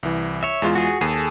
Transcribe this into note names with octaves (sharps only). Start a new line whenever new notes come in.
C2 E3
C#5 E5
E2 G#3 F4
F#4 G#4
D#2 G#4 A4